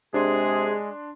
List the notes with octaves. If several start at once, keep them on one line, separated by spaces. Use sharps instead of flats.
C3 G#3 D4 G#4 C6